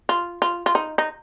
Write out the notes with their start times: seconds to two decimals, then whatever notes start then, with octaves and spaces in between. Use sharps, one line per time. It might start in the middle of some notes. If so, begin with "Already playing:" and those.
0.09 F4
0.42 F4
0.66 F4
0.75 D#4
0.98 D#4